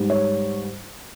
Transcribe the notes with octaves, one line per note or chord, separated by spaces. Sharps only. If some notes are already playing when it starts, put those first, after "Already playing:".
Already playing: G#2 G3
C#5